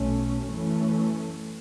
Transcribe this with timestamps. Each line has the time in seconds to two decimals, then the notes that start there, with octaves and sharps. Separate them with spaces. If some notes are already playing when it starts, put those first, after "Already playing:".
Already playing: B1 B2 A3 C#4
0.49 F#2 E3 A3 C#4